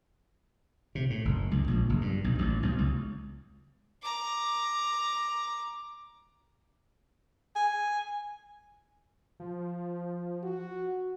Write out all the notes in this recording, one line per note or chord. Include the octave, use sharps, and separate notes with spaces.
C3
A2
F#1
C#2
A#1
F#1
G2
B1
A1
B1
C#2
A#5 D6
G#5
F3
F#4